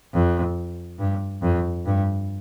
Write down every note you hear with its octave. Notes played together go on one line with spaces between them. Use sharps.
F2
G2
F2
G2